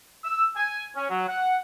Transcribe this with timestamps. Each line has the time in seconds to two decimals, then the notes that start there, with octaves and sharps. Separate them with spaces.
0.24 E6
0.56 G#5
0.96 C#4
1.09 F#3
1.28 F#5